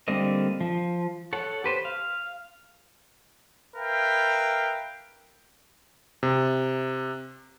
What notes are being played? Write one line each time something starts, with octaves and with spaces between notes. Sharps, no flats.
D3 G3 A#3 C4 D#5
F3
A4 C#5 F#5
G4 B4 C5
F5
A#4 B4 E5 F5 G5
C3